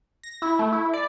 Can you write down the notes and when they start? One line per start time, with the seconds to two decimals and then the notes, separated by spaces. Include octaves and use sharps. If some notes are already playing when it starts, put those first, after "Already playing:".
0.23 A#6
0.42 E4
0.59 A3
0.72 E4
0.93 D5